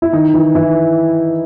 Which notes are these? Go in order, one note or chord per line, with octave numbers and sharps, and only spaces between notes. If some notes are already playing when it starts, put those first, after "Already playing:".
E4
D#3 D#4
E3 E4
E3 E4